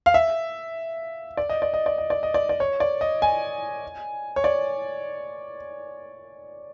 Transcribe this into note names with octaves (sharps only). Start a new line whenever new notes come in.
F5
E5
D5
D#5
D5
D#5
D5
D#5
D5
D#5
D5
D5
C#5
D5
D#5
G#5
C#5
D5